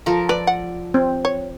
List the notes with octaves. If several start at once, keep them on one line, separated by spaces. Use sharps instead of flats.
F3 A4 A#4
B4 D5
F#5
C4
C#5